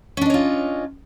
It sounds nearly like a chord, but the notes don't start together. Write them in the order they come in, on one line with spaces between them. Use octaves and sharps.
C#4 D4 D#5 C#5 F4